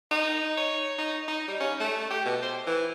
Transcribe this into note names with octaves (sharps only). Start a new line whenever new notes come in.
D#4
C#5
D#4
D#4
G3
C#4
A3
G4
B2
C5
E3